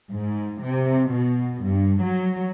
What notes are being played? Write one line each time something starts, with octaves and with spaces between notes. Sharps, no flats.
G#2
C3
B2
G2
F#3